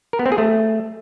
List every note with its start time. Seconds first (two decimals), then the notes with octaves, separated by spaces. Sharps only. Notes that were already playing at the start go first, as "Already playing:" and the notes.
0.13 A#4
0.19 B3
0.26 C4
0.32 G#4
0.38 A3